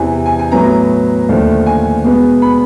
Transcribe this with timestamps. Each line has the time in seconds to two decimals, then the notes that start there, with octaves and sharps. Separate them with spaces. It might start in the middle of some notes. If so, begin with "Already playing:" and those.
Already playing: E2 C3 E3 G#5
0.26 G#5
0.39 G#5
0.52 A2 F#3 B3 A#5
1.29 D#2 D3 F3 A3
1.66 G#5
2.04 B2 G#3 B3
2.42 B5